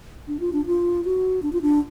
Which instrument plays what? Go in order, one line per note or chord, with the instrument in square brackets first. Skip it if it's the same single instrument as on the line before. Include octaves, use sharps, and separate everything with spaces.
[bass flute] D4
F4
D4
F4
F#4
D4
F4
D4